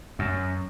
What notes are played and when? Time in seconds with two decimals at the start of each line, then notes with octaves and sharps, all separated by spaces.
0.19 F#2